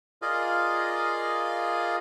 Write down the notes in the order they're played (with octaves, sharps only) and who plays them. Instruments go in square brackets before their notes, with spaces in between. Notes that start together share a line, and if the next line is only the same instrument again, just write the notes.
[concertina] F4 G#4 A#4 D5 D#5 F5